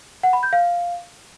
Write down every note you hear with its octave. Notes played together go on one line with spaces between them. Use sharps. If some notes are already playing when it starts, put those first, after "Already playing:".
F#5
B5
G6
F5